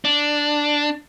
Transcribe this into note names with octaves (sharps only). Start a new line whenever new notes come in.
D4